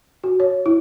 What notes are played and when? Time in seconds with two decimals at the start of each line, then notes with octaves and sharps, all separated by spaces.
0.24 F#4
0.40 C#5
0.66 E4